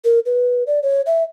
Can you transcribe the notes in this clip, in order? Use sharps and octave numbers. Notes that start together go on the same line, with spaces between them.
A#4
B4
D5
C#5
E5